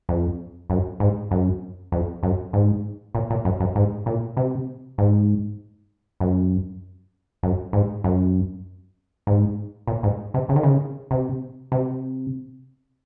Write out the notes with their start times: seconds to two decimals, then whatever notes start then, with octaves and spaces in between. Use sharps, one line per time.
0.09 F2
0.70 F#2
1.00 G#2
1.31 F#2
1.92 F2
2.23 F#2
2.53 G#2
3.15 A#2
3.30 A#2
3.45 F#2
3.60 F#2
3.76 G#2
4.06 A#2
4.37 C3
4.98 G#2
6.20 F#2
7.43 F#2
7.73 G#2
8.04 F#2
9.27 G#2
9.87 A#2
10.03 G#2
10.34 C3
10.49 C#3
10.56 D#3
10.63 C#3
11.11 C3
11.72 C3